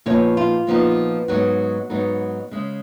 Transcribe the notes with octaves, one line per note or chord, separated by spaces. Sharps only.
A#2 F3 B3 D#4 C#5
F4
A#2 F3 B3 D#4
G#2 F#3 B3 D#4 F#4
G#2 F#3 B3 D#4
C#3 G#3 C#4